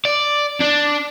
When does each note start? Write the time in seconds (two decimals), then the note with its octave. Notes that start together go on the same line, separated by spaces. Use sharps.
0.05 D5
0.61 D4